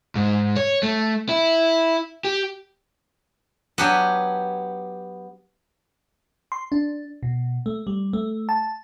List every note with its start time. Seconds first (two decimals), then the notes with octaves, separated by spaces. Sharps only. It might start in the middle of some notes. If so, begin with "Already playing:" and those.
0.15 G#2
0.57 C#5
0.83 A3
1.29 E4
2.25 G4
3.78 F#3 B3 D4 F#4 G4 G#5
6.52 C6
6.72 D4
7.23 B2
7.66 A3
7.87 G3
8.13 A3
8.49 A5